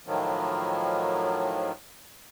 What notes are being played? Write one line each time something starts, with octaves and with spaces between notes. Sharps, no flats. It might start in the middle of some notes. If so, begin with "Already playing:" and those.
A2 D#3 F3 F#3